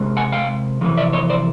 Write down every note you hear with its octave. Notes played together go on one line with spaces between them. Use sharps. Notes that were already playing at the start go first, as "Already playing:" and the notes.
Already playing: C3 G#3
F#5 G#5
F5 G5
F2 C3 E3
D5 E5
C#5 D#5
C5 D5